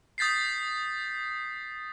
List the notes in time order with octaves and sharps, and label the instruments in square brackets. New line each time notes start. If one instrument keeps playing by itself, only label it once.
[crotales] D#6 G6 A6 B6 C7